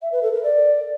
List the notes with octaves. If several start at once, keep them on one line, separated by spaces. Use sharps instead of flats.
E5
B4
A4
A#4
D5